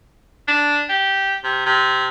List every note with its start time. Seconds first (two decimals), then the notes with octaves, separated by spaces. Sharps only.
0.48 D4
0.89 G4
1.44 C3
1.66 C3